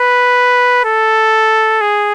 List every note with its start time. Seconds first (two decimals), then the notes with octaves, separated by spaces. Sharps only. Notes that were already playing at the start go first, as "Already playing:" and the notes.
Already playing: B4
0.85 A4
1.81 G#4